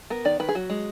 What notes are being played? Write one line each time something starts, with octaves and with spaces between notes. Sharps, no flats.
B3 A#4
D#3 D5
D#3 B4
G#4
F#3 F#4
G#3